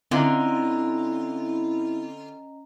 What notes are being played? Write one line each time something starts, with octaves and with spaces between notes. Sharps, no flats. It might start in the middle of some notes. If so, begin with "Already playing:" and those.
D3 C4 C#4 E4 F4 D#5 A#5